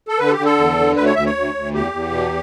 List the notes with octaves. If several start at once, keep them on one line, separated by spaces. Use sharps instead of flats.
A4
D3 B4
A4
G4
D3
A4
E2
D3
D2 B4
C#5
D2 E5
C#5
D2
D2
E2 G4
E2
B2